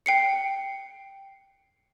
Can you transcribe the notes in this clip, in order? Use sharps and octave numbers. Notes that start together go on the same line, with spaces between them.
G5 C7 C#7